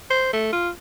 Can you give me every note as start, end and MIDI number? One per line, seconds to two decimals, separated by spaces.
0.10 0.28 72
0.33 0.50 57
0.53 0.69 65